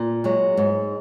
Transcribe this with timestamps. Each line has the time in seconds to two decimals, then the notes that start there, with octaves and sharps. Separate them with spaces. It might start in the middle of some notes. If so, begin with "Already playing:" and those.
Already playing: A#2
0.24 F#3 G#3
0.57 G#2